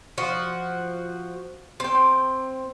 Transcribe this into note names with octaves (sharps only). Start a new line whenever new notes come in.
F3 F#4
C4 G5